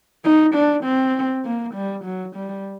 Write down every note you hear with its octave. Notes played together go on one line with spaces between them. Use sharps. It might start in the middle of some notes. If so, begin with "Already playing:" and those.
D#4
D4
C4
A#3
G3
F#3
G3